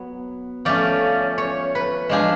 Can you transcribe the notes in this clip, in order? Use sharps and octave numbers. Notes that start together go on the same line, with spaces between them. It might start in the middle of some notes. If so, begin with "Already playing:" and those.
Already playing: F#3 B3
F3 A3 C#4 D5
C#5
B4
F3 G#3 D4 G#4